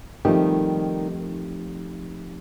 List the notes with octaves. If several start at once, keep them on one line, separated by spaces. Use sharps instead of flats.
D#3 F3 G3 A3 C4 D#4 G4